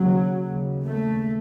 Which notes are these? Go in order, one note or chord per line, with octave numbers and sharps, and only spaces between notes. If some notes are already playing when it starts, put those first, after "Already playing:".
Already playing: D#2 C#3 F#3
D#2 C#3
A3